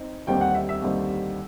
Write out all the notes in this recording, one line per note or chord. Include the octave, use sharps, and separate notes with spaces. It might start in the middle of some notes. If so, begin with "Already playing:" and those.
Already playing: C4 D#4
D#2 D3 G3 C4 D#4 G5
F#5
E5
E5
D#2 D3 G3 C4 D#4